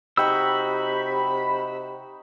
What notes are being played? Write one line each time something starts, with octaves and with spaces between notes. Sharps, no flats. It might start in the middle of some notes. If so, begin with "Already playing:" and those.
C3 D#4 F#4 G5 B5 C#6 E6